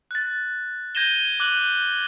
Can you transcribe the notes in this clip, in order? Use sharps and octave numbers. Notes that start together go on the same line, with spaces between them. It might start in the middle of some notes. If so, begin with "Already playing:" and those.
F#6 A6
G6 G#6 A#6 D#7 E7 G7
D6 F#6 D#7 F#7